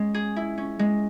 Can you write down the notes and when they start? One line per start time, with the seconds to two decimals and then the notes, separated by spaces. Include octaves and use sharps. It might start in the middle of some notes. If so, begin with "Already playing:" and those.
Already playing: G#3 C#4
0.14 G#4
0.36 E4
0.58 C#4
0.79 G#3